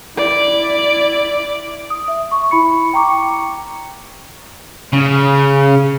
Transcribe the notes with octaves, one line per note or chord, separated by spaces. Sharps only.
E4 D5
D#6
E5
C#6
E4 B5 C#7
G5 A#5 C#6 D6 C#7
C#3